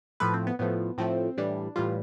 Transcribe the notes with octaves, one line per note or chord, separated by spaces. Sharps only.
A2 F3 A3 B4
C4
B3
A2 F3 A3 B3
A2 F3 A3 C4
A2 E3 G3 D4
A2 E3 G3 F4